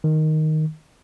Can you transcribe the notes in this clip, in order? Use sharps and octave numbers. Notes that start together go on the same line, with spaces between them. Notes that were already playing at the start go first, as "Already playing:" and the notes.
D#3